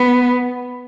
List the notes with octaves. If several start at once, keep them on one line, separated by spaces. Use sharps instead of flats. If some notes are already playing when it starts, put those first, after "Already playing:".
Already playing: B3